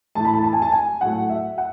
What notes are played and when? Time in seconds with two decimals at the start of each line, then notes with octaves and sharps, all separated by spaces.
0.15 A2 E3 A3 A5
0.25 B5
0.34 A5
0.44 A5
0.53 G#5
0.62 A5
0.72 G#5
1.01 A2 F#3 A3 F#5
1.30 E5
1.58 F#5